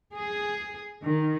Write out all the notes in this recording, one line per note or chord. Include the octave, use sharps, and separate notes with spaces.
G#4
D#3